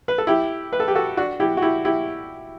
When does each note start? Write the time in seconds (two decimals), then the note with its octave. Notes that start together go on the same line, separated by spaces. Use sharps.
0.08 B4
0.18 A4
0.27 E4 G4
0.73 B4
0.80 A4
0.88 G4
0.95 F#4 A4
1.17 D4 F#4
1.40 E4 G4
1.57 F#4
1.62 E4 G4
1.85 E4 G4